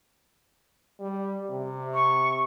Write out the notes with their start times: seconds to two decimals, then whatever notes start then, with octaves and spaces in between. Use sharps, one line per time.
0.99 G3
1.50 C3
1.94 C#6